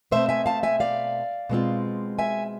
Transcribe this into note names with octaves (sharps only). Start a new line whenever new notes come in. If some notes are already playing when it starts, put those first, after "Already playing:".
B2 A3 C4 C5 E5
E5 G#5
F5 A5
E5 G#5
D5 F5
B2 G#3 C4 F4
E5 G#5